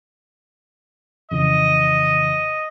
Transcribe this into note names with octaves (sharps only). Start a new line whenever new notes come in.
F2 C#3 E3 D#5